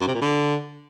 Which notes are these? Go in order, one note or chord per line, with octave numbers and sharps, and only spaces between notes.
F#2
C3
A#2
D3